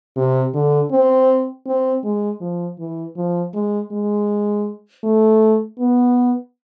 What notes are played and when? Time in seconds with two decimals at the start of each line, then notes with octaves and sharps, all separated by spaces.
0.17 C3
0.54 D3
0.91 C4
1.67 C4
2.04 G#3
2.41 F3
2.79 E3
3.16 F3
3.54 G#3
3.92 G#3
5.04 A3
5.79 B3